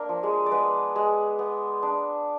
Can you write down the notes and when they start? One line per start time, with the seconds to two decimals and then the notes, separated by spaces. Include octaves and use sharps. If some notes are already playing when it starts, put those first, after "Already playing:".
Already playing: A#3 D4 A#4
0.09 F3
0.23 G#3 G#4
0.46 D5
0.51 G#3 B3 B4
0.96 G#3
1.39 B3
1.83 D4